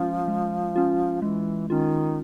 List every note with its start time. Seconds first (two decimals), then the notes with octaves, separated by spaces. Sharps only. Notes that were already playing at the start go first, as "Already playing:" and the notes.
Already playing: F3 G#3 C#4 F4
0.28 G#3
0.76 C#4 F4
1.22 E3 G#3
1.69 D#3 C#4 F4